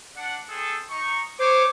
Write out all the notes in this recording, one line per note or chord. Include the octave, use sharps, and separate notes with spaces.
D4 F#5
C4 G#4 A4
D#4 C#6
C5 C#5 D6